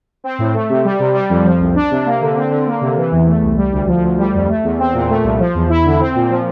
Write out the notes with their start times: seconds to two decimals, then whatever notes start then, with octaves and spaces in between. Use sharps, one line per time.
0.24 C4
0.39 A2
0.54 A3
0.69 C3
0.85 G3
0.99 C3
1.15 G3
1.30 F2
1.45 F3
1.60 C2
1.75 D4
1.91 C3
2.06 A#3
2.21 D3
2.36 C4
2.51 D3
2.66 A#3
2.81 C3
2.97 E3
3.12 E2
3.27 A3
3.42 C2
3.57 G3
3.72 D2
3.87 F3
4.03 D2
4.18 G3
4.34 F2
4.48 A3
4.63 E2
4.79 C4
4.94 A#2
5.09 A3
5.24 C2
5.39 F3
5.55 E2
5.70 E4
5.85 D3
6.00 C4
6.15 A#2
6.30 F3